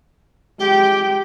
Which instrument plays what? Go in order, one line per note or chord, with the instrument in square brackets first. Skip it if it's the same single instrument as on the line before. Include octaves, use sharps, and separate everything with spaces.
[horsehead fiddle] G#3 G5 [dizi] G4